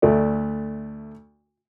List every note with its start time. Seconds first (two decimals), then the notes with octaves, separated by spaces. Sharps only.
0.02 D2 A3 D5